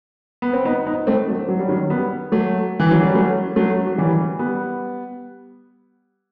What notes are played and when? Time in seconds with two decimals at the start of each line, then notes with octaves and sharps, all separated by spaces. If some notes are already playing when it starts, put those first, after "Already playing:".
0.42 B3
0.53 C4
0.65 B3 D#4
0.86 B3 D#4
1.07 A3 C4
1.28 F#3 A3
1.49 F#3
1.59 G3
1.69 D#3 F#3
1.90 G3 B3
2.32 F#3 A3
2.80 E3
2.91 F#3
3.03 G3
3.15 F#3 A3
3.56 F#3 A3
3.87 F#3
3.98 E3 G3
4.39 G3 B3